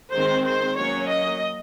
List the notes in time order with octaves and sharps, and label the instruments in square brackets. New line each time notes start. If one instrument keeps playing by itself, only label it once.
[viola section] D#3 G#3 C4 C5
C5
F#3 A#3 C#4 C#5
D#5